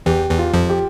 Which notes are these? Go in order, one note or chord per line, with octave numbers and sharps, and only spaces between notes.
E2 E3 G4
E2 E3
F4
F2 F3
G4